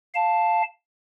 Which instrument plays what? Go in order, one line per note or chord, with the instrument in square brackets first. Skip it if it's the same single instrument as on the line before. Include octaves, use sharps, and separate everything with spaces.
[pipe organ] F5 A5